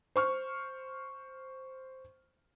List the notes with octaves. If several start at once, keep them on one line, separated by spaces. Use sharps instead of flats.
C5 C#6 F6